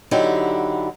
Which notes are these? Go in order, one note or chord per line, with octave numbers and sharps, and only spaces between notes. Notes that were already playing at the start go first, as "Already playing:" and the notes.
D3 F#3 D#4 E4 G4